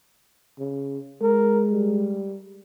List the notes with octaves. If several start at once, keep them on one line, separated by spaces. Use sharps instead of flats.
C#3
G#3 A#4
G3